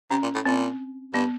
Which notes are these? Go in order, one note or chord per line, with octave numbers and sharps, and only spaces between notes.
C3 C#4
A#2
A2
A#2 C4
G2 B3